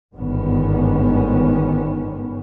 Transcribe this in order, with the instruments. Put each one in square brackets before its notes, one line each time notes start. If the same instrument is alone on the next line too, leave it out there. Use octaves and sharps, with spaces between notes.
[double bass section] G1 G#2 D3 D#3 B3 C#4